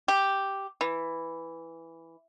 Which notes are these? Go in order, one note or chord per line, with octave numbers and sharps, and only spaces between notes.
G4
E3